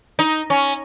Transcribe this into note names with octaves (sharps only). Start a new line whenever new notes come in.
D#4
C#4